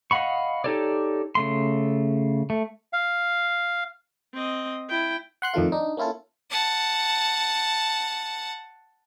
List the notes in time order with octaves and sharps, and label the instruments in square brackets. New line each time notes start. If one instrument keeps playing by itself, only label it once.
[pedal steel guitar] D#5 F5 F#5 B5 C#6
D#4 G4 A4 C#5 D5
C#3 A3 C6
A3
[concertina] F5
[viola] C4 D#5
E4 G5
[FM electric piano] F#5 C6 F#6
F2 D#3 F3 A3 F4
D4 D#4
A#3 C#4 E4 F4 A4
[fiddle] F#5 A5